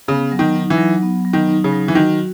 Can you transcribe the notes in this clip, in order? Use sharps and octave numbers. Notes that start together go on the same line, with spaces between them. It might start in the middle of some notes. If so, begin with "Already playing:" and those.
C#3 B3
F#3
D#3
D#4
E3
F#3
B3
F#3
D#3
D#4
C#3
F#3
E3
D#3 F#4